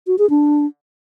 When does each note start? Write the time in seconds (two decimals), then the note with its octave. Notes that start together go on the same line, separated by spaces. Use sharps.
0.07 F#4
0.18 G#4
0.30 D4